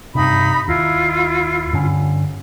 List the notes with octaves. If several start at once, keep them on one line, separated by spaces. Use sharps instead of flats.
G2 C3 D#4 B5
D#2 E4 F4
G2 D3 C#4